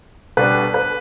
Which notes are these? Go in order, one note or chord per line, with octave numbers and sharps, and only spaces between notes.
B2 G3 B3 D4 B4
B4